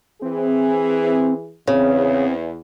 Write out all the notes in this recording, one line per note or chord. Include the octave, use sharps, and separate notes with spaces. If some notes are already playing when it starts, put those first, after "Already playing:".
E3 C4 G#4
E2 C#3 C4